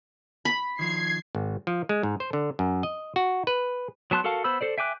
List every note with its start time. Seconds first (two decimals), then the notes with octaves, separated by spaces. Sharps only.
0.45 B5
0.79 D#3 F3 G#6 C7
1.35 G#1
1.67 F3
1.89 G#3
2.03 G#2
2.20 C5
2.33 D3
2.59 F#2
2.83 D#5
3.16 F#4
3.47 B4
4.11 F#3 B3 A5 C6 F#6
4.24 F#4 A4 A#4 F5 A5
4.44 B3 C5 B5 E6
4.61 A4 C5 D5
4.78 E5 G5 G#5 D6 F#6